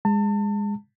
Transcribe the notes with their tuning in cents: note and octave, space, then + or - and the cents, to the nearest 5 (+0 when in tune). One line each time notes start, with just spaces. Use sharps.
G#3 -20 A5 +35